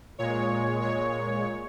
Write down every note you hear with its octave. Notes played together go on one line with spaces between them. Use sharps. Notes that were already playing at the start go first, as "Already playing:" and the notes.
A#2 G#3 C#5
A#2 G#3 C#5